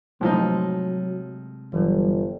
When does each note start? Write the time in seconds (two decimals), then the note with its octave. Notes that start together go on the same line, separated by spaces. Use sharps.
0.21 A2 C3 F3 F#3 G#3 D#4
1.73 G1 E3 F#3 G3